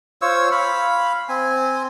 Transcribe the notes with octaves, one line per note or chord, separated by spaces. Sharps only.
F4 C5 C#5 E6
F5 B5
C4 G#5